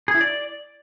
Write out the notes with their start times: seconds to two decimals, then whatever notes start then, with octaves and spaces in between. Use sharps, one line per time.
0.08 G#4
0.14 E4
0.21 D5